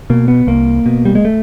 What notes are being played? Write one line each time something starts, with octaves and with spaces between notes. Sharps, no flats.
B2 A#3
B3
C2 A#3
B2
G3
G#3
A3